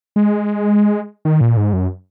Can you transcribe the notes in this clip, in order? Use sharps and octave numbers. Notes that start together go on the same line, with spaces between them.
G#3
D#3
A#2
G#2
F#2